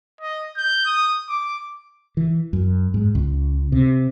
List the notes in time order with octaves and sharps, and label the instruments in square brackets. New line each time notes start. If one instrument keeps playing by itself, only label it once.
[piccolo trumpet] D#5
G6
D#6
D6
[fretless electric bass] E3
F#2
G#2
C#2
C3